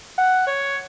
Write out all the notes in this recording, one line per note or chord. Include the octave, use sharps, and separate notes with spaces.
F#5
C#5